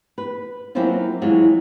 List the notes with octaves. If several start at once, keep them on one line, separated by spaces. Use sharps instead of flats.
B4
F#3 A#3 C4 C#4 E4 F4
E3 F#3 G#3 F4 F#4